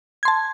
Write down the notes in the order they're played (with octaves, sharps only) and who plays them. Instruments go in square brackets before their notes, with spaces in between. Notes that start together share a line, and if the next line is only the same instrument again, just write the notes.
[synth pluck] G#6
C6
A5